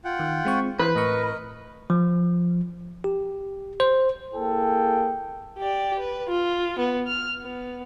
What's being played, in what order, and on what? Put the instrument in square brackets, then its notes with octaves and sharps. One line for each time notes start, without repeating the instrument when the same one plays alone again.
[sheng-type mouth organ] F4 F#5 G5
[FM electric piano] D#3
G#3 C4 C#6
[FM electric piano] E3 [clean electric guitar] B4 [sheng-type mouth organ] C5
[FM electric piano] A2 C#6 [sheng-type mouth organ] A#4 D#5
[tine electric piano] F3
G4
C5
[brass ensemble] A#3 E4 G#4 A4 G5
[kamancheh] G4 D5
B4
F4
B3
F6
B3